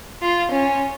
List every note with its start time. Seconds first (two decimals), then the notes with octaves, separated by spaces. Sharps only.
0.22 F4
0.52 C#4